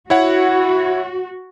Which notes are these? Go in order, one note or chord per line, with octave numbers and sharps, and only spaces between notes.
E4 F#4 C#5 F#5